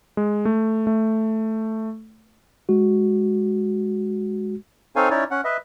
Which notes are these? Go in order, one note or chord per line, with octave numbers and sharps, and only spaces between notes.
G#3
A3
A3
G#3 F#4
C4 D#4 A4 C#5 F5 G#5
C#4 D#4 E4 C#5 D5
C#4 F#5
B4 D#5 E5